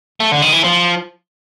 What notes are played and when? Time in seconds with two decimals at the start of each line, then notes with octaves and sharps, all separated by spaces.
0.20 A3
0.32 D3
0.42 D#3
0.52 E3
0.64 F3